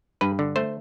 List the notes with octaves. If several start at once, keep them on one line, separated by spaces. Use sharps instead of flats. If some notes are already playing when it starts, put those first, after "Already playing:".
G2 B4
D3
A3 C5